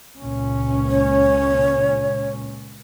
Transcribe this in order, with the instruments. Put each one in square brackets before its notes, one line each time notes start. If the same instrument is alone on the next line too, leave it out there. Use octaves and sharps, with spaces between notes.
[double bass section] C#2 A#2 C#4
[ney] C#5